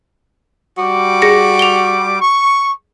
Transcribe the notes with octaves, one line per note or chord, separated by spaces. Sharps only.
G3 F#4 D6
G#4 A#6 C#7
F7 G7
C#6